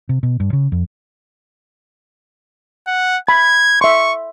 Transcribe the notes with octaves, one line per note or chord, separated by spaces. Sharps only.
C3
B2
G2
C#3
F2
F#5
B5 G#6
E5 C6 C#6